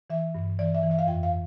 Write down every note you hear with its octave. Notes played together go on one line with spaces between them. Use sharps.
E3 E5
G2
E3 D5
E5
E3
E5
F5
F2 G5
F5